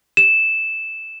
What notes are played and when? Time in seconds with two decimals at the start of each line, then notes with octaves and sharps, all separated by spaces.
0.17 E7